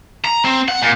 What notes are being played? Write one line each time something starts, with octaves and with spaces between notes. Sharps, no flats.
A#5
C4
F#5
A#2